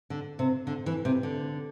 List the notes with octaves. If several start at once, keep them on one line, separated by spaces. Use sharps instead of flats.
D3
C3
D3
E3
C3
D3